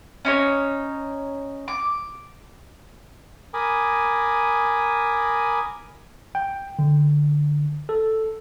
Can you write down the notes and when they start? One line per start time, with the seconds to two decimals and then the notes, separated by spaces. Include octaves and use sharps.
0.25 C#4 D#4 C#5
1.68 D6
3.54 A#4 G#5 B5 D6 D#6
6.35 G5
6.79 D3
7.89 A4